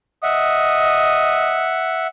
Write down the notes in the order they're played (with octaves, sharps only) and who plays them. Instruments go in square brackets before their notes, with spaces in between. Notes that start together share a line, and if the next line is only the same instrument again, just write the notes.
[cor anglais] D#5 [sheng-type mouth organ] E5 F#5